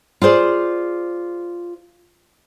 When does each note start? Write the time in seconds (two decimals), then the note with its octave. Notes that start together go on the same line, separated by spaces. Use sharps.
0.22 F4 G#4 C5 D5